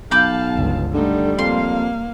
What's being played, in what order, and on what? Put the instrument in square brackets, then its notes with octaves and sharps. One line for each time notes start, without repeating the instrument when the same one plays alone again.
[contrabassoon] B1 [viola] F5 A5 [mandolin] B5 D6 G6
[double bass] G1 C#2
[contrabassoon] D3 [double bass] G3 [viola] A3 D#4
[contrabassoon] F2 [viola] A#3 F5 [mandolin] C6